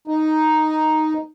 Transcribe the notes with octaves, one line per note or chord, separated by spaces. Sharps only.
D#4